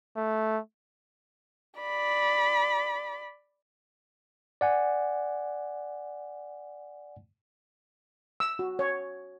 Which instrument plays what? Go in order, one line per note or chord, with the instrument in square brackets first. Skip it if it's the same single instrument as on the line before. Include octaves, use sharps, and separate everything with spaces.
[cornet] A3
[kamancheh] D5 B5
[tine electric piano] D5 F#5 G#5
[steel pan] E6
F#4
C#5